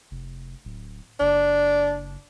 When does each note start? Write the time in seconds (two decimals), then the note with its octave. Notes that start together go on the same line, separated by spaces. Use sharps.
0.11 F1
0.65 D1
1.20 F#1 D4